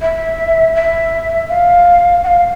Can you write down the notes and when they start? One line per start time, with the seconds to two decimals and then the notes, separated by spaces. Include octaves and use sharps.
0.01 E5
0.76 E5
1.49 F5
2.24 F#5
2.27 F5